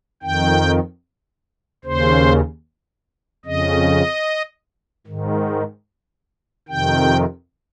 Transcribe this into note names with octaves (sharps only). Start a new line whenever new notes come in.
F2 D#3 G5
D#2 C#3 C5
F2 C#3 D#5
G#2 D#3
F2 C3 D#3 G5